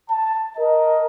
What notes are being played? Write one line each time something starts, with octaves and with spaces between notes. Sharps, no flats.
A5
A#4 D#5